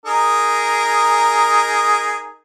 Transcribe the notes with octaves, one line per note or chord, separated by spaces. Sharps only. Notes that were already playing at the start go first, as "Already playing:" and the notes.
D#4 G#4 A#4